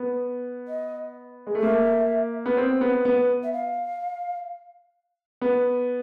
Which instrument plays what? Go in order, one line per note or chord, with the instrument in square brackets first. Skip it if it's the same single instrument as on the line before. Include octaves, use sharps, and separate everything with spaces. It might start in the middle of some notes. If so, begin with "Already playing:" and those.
Already playing: [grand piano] B3
[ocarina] D#5
[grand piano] G#3
A3
[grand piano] A#3 [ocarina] E5
[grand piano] B3
C4
B3
B3
[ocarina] E5
F5
[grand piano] B3